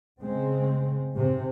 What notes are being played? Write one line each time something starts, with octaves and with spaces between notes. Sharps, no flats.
C#3 G#3 C4
G#2 C3